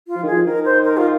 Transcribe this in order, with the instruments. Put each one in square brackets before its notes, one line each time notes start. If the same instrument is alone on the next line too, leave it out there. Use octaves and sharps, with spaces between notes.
[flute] F4
[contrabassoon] F3
D#3
[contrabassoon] F3 [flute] G#4
[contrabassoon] D#3 [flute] A#4
[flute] C5
A#4
F4